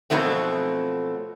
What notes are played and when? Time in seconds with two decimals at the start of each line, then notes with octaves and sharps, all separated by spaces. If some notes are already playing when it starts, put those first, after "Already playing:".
0.10 F2 B2 F#3 A3 C4